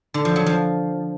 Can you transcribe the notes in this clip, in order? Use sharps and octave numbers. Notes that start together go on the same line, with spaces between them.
D3
F3
F#3
F3